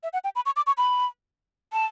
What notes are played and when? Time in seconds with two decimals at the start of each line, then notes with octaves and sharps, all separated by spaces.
0.03 E5
0.13 F#5
0.24 G5
0.36 B5
0.46 C#6
0.56 D6
0.67 C#6
0.78 B5
1.73 A5